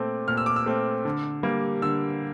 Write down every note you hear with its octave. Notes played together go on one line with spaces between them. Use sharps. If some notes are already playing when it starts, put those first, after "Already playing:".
Already playing: A#2 A3 C4 D6
A#2 F6
E6
D6
E6
A3 C4
D3
G3 A#3
D3 E6